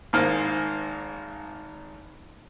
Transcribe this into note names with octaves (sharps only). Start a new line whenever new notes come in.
G#1 G#2 A#3 C5 F6